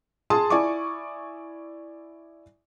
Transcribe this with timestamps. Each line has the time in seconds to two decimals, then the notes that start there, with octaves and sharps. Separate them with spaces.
0.30 G#4 A5 C6 D#6
0.50 E4 D5 G#5 C#6 D6